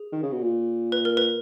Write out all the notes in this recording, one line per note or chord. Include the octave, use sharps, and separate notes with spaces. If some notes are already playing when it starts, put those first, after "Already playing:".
Already playing: G#4
D#3
C#3
B2
A#2
B4
A#4
B4